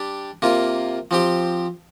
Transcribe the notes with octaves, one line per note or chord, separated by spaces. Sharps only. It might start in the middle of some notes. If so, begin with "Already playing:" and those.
Already playing: G3 D4 G4
C3 A#3 F4
F3 C4 G4